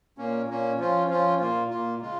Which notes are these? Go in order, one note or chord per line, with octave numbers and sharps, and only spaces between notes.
A#2 A#3 C#4
A#2 A#3 C#4
F3 C#4 F4
F3 C#4 F4
A#2 A#3 F4
A#2 A#3 F4
C#3 G#3 F4